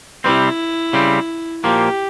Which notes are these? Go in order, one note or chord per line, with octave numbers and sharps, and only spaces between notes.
C3 G3 C4 E4
C#3 G3 C4
A#2 F3 A#3 G4